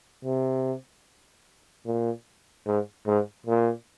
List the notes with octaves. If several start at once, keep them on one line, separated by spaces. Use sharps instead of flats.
C3
A#2
G#2
G#2
A#2